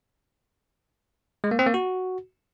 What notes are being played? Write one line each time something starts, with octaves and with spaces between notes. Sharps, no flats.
G#3
A#3
C4
A#3
F#4